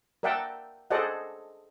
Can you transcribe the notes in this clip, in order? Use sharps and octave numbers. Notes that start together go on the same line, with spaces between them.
A#4 D5 E5 F#5 G5 A5
G#4 A4 C5 D5 D#5 F#5